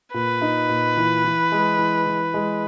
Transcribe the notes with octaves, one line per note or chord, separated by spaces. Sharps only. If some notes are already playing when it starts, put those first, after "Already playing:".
A#2 B4
D#4
A#2
E3
E3
G#3
E3
E3
G#3